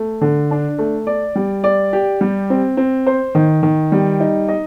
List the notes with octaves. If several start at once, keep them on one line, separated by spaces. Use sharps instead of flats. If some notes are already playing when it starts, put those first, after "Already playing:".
Already playing: A3
D3
D4
A3
D5
G3
D5
G4
G3
C4
C4
C5
D#3
D#3
G3
D#4
D#5